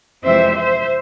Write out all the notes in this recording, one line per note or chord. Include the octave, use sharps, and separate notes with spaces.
F2 C3 E3 G#3 C4 C5 E5
C5 E5